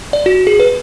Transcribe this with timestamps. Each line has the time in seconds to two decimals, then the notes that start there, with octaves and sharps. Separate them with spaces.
0.13 D5
0.26 F#4
0.47 G#4
0.60 B4